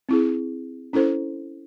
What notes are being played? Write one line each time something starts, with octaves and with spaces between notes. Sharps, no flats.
C4 E4 G#4
C#4 E4 A4 C5